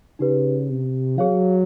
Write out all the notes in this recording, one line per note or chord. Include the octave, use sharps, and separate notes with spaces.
C#3 D#4 G4 B4
C3
F#3 G#4 C#5 F5